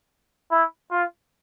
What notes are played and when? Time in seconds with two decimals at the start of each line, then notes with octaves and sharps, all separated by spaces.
0.51 E4
0.91 F4